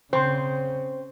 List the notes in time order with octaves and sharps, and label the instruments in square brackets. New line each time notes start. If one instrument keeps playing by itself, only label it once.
[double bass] C#3 [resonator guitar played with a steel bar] C4 [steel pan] C5 C6